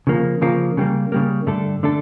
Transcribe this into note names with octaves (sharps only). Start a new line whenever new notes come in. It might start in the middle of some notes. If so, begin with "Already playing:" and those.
C#3 F3 A#3
C#3 F3 A#3
C#3 G3 A#3
C#3 G3 A#3
G2 D3 A3 D4 A4
D3 A3 D4 A4